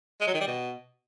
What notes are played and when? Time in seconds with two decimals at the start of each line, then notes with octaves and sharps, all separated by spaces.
0.21 G#3
0.27 F#3
0.34 D#3
0.40 G3
0.47 B2